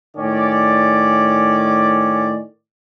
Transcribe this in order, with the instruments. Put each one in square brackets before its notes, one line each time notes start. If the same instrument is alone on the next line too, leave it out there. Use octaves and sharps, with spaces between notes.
[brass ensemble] A2 D#3 C#4 D5